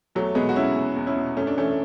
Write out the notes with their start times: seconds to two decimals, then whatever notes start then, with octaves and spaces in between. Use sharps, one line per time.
0.15 E2 F#3 A3
0.35 B2 G#3 B3
0.49 F#4
0.55 B2 C#4 E4
0.76 E2
0.96 E2
1.07 C#4 E4
1.16 B2
1.37 F#2 A3 C#4
1.47 D4
1.58 E3 A3 C#4